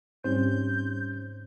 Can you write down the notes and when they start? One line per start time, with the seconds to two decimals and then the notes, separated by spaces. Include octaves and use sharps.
0.24 G#2 G3 C4 C#4 D#4 C5 G6